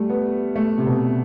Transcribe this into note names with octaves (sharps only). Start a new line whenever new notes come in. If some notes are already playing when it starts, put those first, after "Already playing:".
Already playing: G3 A3
B3
A3
C3
B2